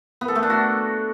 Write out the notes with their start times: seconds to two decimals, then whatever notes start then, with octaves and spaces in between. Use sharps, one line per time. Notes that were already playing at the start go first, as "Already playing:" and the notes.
0.21 B3
0.28 A4
0.35 A3
0.43 D4
0.50 F#4